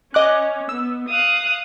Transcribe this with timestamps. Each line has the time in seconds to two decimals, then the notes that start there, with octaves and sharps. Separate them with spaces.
0.14 C#4 D#5 D6 F#6
0.69 B3 E6
1.09 F5 D#6 F#6